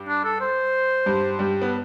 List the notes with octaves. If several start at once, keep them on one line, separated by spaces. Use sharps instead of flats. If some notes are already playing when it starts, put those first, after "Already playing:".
Already playing: G2
D4
A4
C5
G2 G3
G2 G3
B3